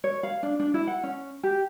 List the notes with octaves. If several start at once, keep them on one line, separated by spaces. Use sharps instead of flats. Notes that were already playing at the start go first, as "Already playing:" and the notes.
C#5
F5
D4
D4
E4
F#5
C#4
G4